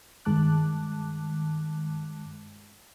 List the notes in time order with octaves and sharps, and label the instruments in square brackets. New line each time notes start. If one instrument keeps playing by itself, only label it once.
[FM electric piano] G2 D#3 G#3 A5 D6 F#6